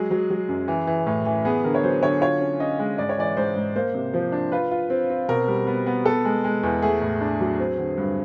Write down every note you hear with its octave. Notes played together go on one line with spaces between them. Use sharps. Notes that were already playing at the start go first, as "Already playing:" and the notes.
Already playing: F#3 G#3 G#4
F#3
F#3
F#2
E3
E3
A2
E3
B3 G#4
D3 A#4
C#5
F#3 C5
D3 C#5
F4 C#5
C#4
C#4 D#5
G#3
G#2 D5
C#5
E3 D5
G#2 C5
G#2
A#3 C5
C3
F3
D4
F4 B4
F4
C4
C4
B2 A#4
G3
B3
B3
B3 A4
G#3
G#3
E2
A3 G#4
A2
D4
F#3
C4
D3
G2